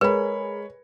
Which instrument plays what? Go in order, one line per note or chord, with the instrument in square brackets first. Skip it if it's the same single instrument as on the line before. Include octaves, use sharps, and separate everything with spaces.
[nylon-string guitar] G#3 [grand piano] G#4 A#4 [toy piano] B4 [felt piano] C#5 B5